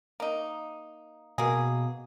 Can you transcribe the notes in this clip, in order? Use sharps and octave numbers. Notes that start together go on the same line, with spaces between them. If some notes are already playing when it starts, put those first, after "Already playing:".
A#3 D#4
B2 A#3 G#4